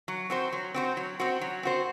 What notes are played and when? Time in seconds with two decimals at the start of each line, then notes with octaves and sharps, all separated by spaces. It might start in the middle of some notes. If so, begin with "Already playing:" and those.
0.08 F#3
0.30 C4 F#4 C5
0.53 F#3
0.74 C4 F#4 C5
0.97 F#3
1.20 C4 F#4 C5
1.41 F#3
1.63 C4 F#4 C5